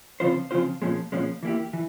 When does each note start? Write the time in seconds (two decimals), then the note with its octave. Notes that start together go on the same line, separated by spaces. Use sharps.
0.20 C#3 F3 C4 F4 C5
0.51 C#3 F3 C4 F4 C5
0.82 A#2 F3 G#3 C#4
1.12 A#2 F3 G#3 C#4
1.43 E3 A#3 E4 G4
1.73 E3